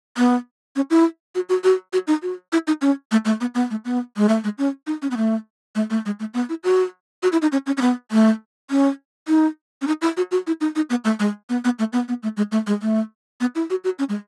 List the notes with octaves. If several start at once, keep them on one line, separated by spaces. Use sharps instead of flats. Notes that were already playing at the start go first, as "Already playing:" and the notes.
B3
C#4
E4
F#4
F#4
F#4
F#4
D#4
F#4
E4
D#4
C#4
A3
A3
B3
B3
A3
B3
G#3
A3
G#3
C#4
D#4
C#4
B3
A3
A3
A3
G#3
A3
B3
E4
F#4
F#4
E4
D#4
C#4
C#4
C#4
B3
A3
C#4
D#4
C#4
D#4
E4
F#4
F#4
E4
D#4
D#4
B3
A3
G#3
B3
B3
A3
B3
B3
A3
G#3
A3
G#3
A3
B3
E4
F#4
F#4
C#4
G#3